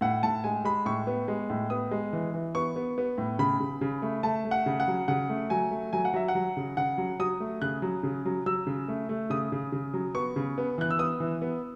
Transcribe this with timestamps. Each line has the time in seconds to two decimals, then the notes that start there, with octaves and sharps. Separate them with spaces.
0.01 A2 F#5
0.23 A2 A5
0.44 G#3 G#5
0.65 G#3 B5
0.85 A2 C#6
1.07 B3
1.28 G#3
1.50 A2
1.70 B3 D#6
1.91 G#3
2.13 E3
2.34 E3
2.55 B3 C#6
2.76 B3
2.98 B3
3.18 A2
3.39 C#3 B5
3.60 C#3
3.81 C#3
4.02 A3
4.23 A3 A5
4.45 A3
4.51 F#5
4.66 C#3
4.80 F#5
4.88 F#3
5.08 C#3 F#5
5.29 A3
5.50 F#3 G#5
5.71 A3
5.93 F#3 G#5
6.05 F#5
6.14 F#3 E5
6.28 F#5
6.35 F#3
6.57 C#3
6.77 C#3 F#5
6.98 F#3
7.19 F#3 D#6
7.40 A3
7.62 C#3 F#6
7.82 F#3
8.03 C#3
8.25 F#3
8.46 F#3 E6
8.67 C#3
8.88 A3
9.09 A3
9.30 C#3 D#6
9.52 C#3
9.72 C#3
9.94 F#3
10.15 B3 C#6
10.36 C#3
10.58 B3
10.78 E3 F#6
10.91 E6
10.99 B3 D#6
11.20 E3
11.42 B3